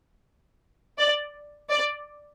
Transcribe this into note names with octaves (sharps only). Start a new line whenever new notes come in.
D5
D5